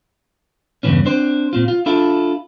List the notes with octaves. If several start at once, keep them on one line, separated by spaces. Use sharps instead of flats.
E2 G2 A#2 C#3 E3 C#4
C4 D4 C5
A#2 C4 F4
F4
D4 E4 F4 A4